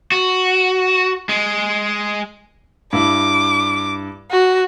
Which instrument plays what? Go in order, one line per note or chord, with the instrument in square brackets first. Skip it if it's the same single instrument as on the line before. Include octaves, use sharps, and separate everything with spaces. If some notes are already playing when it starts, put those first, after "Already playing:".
[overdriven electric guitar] F#4
G#3
[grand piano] G2 E4 [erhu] D6
[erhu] F#4